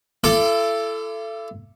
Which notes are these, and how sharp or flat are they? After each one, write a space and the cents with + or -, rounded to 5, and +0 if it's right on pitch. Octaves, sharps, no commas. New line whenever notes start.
E4 +45 A4 +0 D6 +0